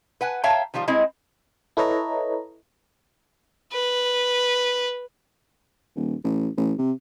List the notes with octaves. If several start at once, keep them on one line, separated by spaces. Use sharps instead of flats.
B4 F#5 G#5
C#5 E5 F5 G5 A5 A#5
D#3 F3 G3 F4
G#3 C4 E4 D#5
E4 A4 B4 C#5 D#5 A#5
B4
D#1
A1
A1
C3